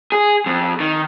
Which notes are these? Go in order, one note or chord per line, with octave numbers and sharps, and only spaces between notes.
G#4
F2
D#3